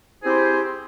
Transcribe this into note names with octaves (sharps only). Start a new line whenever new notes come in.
C4 E4 G4 G#4 C5